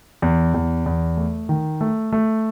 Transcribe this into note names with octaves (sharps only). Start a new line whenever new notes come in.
E2
E2
E2
A3
D#3
A3
A3